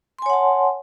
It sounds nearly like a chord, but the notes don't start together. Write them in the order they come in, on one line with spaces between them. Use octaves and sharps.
C6 G#5 C#5 F#5 A5